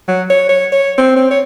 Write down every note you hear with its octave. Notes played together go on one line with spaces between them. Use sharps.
F#3
C#5
C#5
C#5
C4
C4
C#5